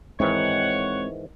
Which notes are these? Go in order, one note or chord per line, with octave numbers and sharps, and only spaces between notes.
G#2 D#3 E3 G#3 C4 C#5 F#5